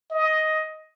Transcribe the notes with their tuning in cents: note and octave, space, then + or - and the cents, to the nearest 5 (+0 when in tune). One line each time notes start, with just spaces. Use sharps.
D#5 +10